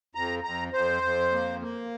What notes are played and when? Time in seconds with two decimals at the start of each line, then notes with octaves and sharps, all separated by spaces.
0.15 F2 A#5
0.44 F2 A#5
0.73 F2 C5
1.03 F2
1.32 A#3
1.61 A#3